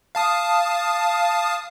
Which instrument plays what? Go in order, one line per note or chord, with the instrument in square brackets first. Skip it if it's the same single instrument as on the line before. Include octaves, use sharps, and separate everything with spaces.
[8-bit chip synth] F5 A5 D#6